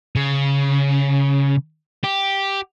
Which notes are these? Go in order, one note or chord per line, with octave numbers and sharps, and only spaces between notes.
C#3
G4